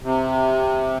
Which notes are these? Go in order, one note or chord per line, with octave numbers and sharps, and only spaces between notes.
C3